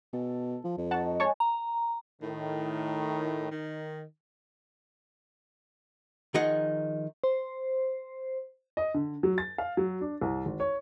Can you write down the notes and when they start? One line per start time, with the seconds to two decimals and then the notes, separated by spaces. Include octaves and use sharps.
0.13 B2 A4
0.64 F3
0.78 F2
0.91 D#4 F#4 F#5 A5
1.20 G#3 C#5 G#5 A5 C#6
1.40 A#5
2.22 A2 D#3
3.51 D#3
6.34 D#3 F3 D#4 G#4 D#5 F#5
7.24 C5
8.77 D#5
8.94 D3
9.23 F#3
9.38 A6
9.58 F5
9.77 F#3
10.01 D4
10.21 C2
10.46 G#1
10.60 C#5